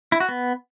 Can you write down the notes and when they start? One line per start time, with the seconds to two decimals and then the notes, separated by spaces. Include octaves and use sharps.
0.12 E4
0.20 F#4
0.29 B3